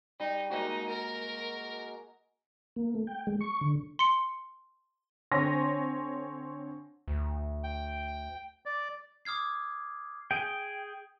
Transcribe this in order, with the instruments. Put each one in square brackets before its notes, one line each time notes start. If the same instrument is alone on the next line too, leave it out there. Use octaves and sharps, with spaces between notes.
[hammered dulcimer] G3 [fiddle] D#4
[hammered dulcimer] G#3 A#3 F#4 [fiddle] D#4
[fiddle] A#4
[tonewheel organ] A#3
A3
G5
G#3
C#6
D3
[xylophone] C6 C#7
[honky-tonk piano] D3 C4 C#5 G#5 C6 A#6
[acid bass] D2
[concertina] G5
D5
[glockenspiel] D6 D#6 F6 G#6 C7
[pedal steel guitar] G#4 G5